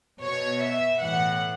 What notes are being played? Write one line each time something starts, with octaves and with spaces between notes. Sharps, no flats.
B2 C#5
E5
A2 E3 F#5